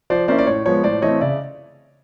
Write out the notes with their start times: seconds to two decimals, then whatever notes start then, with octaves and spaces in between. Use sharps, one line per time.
0.10 F3 C5 D5
0.28 A#3 C#4 E4 C5 D5
0.38 D5
0.47 A2 C#5
0.66 F3 G#3 B3 C#5
0.83 A2 C5 D5
1.02 E3 A3 C4 C#5 D#5
1.20 C#3 D5 E5